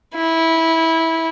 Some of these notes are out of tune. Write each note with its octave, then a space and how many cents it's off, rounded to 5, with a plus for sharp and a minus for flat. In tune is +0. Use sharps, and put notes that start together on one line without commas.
E4 -15